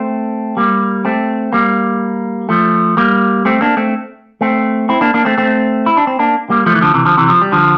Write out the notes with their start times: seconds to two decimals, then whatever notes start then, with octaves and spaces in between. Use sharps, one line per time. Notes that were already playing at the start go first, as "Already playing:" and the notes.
Already playing: A3 C4
0.57 G3 A#3
1.05 A3 C4
1.53 G3 A#3
2.49 F3 A3
2.97 G3 A#3
3.45 A3 C4
3.61 A#3 D4
3.77 A3 C4
4.41 A3 C4
4.89 C4 E4
5.01 A#3 D4
5.14 A#3 D4
5.25 A3 C4
5.38 A3 C4
5.86 E4
5.97 D4
6.07 C4
6.19 A#3 D4
6.50 G3 A#3
6.66 F3 A3
6.75 E3
6.81 D3 F3
6.94 C3 E3
7.05 D3 F3
7.17 C3 E3
7.29 F3
7.42 G3
7.52 D3 F3